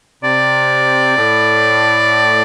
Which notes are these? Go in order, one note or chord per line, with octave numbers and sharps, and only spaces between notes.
C3 D5
A2